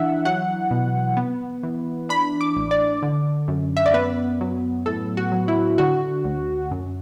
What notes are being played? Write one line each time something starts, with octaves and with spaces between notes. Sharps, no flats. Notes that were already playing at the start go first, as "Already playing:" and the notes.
Already playing: E3 D4 E5 F#5
F#3 F#5
B2
B3
E3
D4 B5
D6
A1
D5
D3
F#2
E5
D5
B3 B4
F#3
A2 A4
F#4
F#3
E4
D3 F#4
D2
F#2